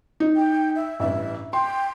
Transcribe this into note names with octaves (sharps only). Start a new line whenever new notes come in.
D#4
G5
E5
A1 G2 E5
G5 C6